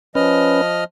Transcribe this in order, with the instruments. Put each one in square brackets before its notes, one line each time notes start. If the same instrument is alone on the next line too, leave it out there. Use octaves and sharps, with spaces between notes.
[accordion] F3 D#5 F6 [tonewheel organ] C#4 B4